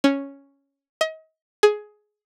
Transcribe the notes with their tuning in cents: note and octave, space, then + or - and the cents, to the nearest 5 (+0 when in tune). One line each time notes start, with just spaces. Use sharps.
C#4 +0
D#5 +35
G#4 +15